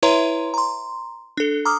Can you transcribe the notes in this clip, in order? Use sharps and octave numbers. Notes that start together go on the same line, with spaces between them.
E4 B4 C#5 E5 A#5 C6
A#5 C6
D4 A4
A#5 D6 D#6 F6